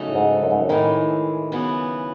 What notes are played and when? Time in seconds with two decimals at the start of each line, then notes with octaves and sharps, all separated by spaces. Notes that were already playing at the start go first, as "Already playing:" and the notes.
Already playing: C#3 F#3 A3 D#4
0.08 A2
0.15 G#2
0.43 F#2
0.51 G#2
0.59 F#2
0.69 A2 D#3 E3 G#3
1.52 F#2 C#3 E3 B3 F#4